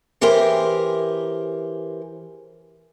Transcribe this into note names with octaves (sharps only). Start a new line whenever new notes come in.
E3 G4 G#4 A#4 C5